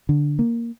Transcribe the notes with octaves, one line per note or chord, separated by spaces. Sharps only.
D3
A#3